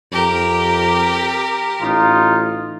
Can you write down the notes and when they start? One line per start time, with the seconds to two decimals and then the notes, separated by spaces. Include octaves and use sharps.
0.12 F2 G4 A#4
1.81 A1 D#4 F4